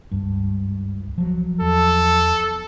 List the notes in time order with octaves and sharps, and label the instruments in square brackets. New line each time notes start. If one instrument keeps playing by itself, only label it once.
[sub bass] C#2 [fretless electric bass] G2
[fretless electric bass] F3 F#3
[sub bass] E2 [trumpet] A4